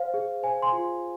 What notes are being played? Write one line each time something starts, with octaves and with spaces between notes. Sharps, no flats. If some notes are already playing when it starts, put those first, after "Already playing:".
Already playing: C5 F5
G#4
C5 G#5
G#5 C6
F4